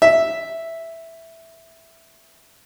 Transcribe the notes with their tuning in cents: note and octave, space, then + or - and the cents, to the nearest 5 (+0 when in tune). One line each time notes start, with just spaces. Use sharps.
E5 +0